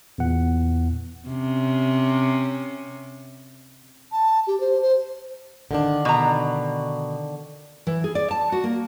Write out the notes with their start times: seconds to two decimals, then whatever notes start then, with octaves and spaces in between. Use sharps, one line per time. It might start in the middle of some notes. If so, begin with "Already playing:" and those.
0.18 E2 A#2 F#5
1.29 C3 C#4
4.12 A5
4.47 G4
4.61 C5
4.82 C5
5.71 D3 D#3 D4
6.05 B2 A#5
7.87 E3
8.04 G#4
8.15 D5
8.31 A5
8.52 F#4
8.64 A#3